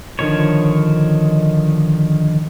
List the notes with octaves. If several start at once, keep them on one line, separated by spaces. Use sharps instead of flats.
D3 D#3 F3 C#5